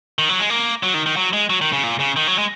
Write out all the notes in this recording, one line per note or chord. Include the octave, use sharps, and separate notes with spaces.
D#3
F#3
G#3
A#3
F#3
D#3
D#3
F#3
G#3
F#3
D#3
C#3
A#2
C#3
D#3
F#3
G#3